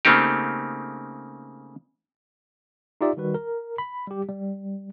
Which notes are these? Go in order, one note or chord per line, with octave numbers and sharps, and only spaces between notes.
C#3 A3 A#3 C4 D#4 G4
D#4 F4 G4 D5 E5
D#3 G3 F#4 B4
A#4
B5
G3 G4
G3